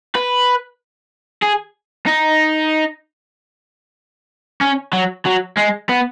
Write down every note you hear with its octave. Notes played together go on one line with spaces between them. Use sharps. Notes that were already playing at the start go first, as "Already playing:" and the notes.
B4
G#4
D#4
C#4
F#3
F#3
G#3
B3